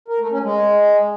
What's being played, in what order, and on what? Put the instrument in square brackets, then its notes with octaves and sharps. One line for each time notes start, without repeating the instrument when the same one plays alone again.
[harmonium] A#4
A3
C#4
G#3